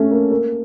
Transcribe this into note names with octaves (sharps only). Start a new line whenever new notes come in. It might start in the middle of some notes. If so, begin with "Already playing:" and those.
Already playing: A3 C#4
A#3
A#3